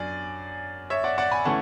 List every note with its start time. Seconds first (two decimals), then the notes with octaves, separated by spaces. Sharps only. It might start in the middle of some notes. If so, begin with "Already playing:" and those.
Already playing: F#2 D4 D5 G#5
0.90 C#5 E5
1.04 D5 F#5
1.18 D5 F#5
1.31 G#5 B5
1.45 E3 A3 C#4 F#5 A5